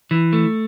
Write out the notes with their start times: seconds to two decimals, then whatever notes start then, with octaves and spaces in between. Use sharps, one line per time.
0.11 E3
0.33 A3